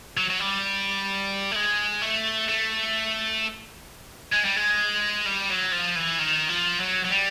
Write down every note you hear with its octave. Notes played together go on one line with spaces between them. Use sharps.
F#3
F#3
G3
A3
G#3
A3
A3
G#3
G3
G#3
G3
F#3
F3
E3
D#3
F3
F#3
F#3
G3